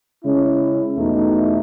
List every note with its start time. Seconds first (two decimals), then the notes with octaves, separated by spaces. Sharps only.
0.22 C#3 G#3 C#4 E4
0.98 E2 B2 A3 D#4